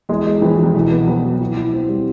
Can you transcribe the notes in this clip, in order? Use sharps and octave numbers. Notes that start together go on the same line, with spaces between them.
E2 G#3
G#3
F2 E3
E2
F2 E3
E2 B2
B3
F2 B3
F#3
E4
E4
C4
G3